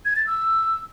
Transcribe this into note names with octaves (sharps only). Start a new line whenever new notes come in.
G#6
A6
E6